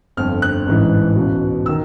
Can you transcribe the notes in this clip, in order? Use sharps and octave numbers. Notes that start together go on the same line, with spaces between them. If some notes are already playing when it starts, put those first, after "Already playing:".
G1 F2 D3 F6
F#6
A1 G#2 E3
C#2 B2
E6
D#3